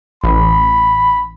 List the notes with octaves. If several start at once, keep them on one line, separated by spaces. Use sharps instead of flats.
A1 B5